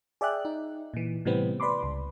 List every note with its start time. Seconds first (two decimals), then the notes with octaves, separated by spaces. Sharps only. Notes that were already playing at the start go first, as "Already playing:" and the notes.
0.21 G#4 D5 E5 G5 F#6
0.45 D#4
0.94 A#2 E3
1.25 A2 C3 E3 G3 B3 C4
1.60 B4 D5 B5 C6 D6
1.83 C#2